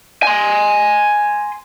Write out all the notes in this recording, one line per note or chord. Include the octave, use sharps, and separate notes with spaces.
G#5 C6